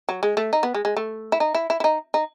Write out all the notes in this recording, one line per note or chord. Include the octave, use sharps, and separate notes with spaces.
F#3
G#3
A3
D#4
B3
G#3
G#3
A3
E4
D#4
E4
E4
E4
D#4
D#4